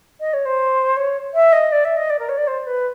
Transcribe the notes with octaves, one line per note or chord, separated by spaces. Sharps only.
D#5
C#5
C5
C#5
E5
D#5
D5
E5
D#5
D5
A#4
C#5
D5
C5
B4